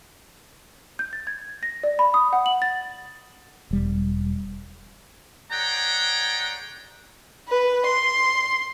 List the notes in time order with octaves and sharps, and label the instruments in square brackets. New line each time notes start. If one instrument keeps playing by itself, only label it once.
[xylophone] G6
A6
G#6
A#6
D5
B5
D#6
F#5
F#7
A6
[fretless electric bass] E1 G3
[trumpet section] G#4 C#5 D5 F#5 G5 A#5
[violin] B4
C6